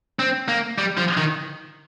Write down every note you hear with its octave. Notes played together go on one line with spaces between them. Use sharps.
C4
A#3
G3
F3
D#3